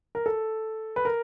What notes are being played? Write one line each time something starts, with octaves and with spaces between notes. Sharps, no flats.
A#4
A4
B4
A#4